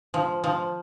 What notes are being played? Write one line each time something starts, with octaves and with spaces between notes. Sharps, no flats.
F3
F3